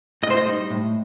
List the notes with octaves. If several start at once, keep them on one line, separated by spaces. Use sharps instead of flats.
A2 D#5
C5
D#5
G3 D#4
A2